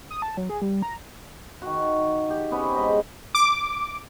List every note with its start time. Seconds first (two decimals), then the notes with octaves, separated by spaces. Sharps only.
0.10 D#6
0.22 A5
0.37 F#3
0.50 G#4
0.62 G3
0.82 A#5
1.62 D#3 F#4
2.30 G4
2.51 C3 B3 C#4
2.73 G#2 D#5 B5
3.35 D6